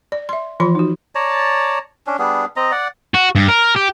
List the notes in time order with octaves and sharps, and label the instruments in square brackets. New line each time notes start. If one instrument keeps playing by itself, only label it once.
[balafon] D5
E5 C6
E3 F3 F4 B5 C6
D#4 F#4
[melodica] C#5 D5 A5 A#5
C#4 D4
G3 B3 D4 G#4
C4 D#5 A#5
D5 F#5
[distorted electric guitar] F#4
G2
A#4
G4